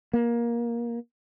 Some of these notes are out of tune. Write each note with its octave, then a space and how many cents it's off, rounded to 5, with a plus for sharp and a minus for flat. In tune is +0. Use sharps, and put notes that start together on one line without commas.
A#3 +15